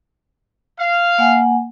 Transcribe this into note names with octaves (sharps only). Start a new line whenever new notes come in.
F5
A#3 F#5 G#5